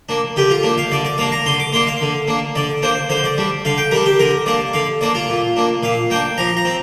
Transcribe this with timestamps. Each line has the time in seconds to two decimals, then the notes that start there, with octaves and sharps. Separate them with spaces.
0.09 A#3 D4
0.36 D3 G4
0.50 F4
0.63 A#3 D4
0.78 F5
0.92 D3 D5
1.05 D5
1.18 A#3 D4 F5
1.32 A#5
1.46 D3 C6
1.60 D6
1.73 A#3 D4 C6
1.87 F5
2.01 D3
2.28 A#3 D4
2.55 D3 D5
2.82 A#3 D4 C5
3.09 D3 C5
3.24 D5
3.38 G3 D4
3.65 D3 F5
3.78 G5
3.91 G3 D4 A#4
4.06 G4
4.19 D3 A#4
4.46 A#3 D4 D5
4.73 D3 F5
5.01 A#3 D4 D5
5.15 F4
5.29 A#2
5.57 A#3 D4
5.83 A#2 F5
6.10 A#3 D4 G5
6.38 F3 A#5
6.57 A#5
6.65 C4